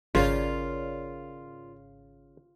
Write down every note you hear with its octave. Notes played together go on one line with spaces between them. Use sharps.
G#1 C#3 F4 A#4 C#5 D5